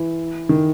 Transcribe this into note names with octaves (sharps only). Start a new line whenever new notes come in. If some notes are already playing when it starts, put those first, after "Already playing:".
Already playing: E3
D#3